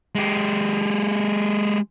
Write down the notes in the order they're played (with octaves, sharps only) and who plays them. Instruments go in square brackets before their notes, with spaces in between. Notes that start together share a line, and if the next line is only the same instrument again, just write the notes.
[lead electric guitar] G#3 G4